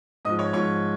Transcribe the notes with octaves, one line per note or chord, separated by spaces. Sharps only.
G#2 F3 D#5 D#6
C#5 C#6
G#2 F3 C#5 C#6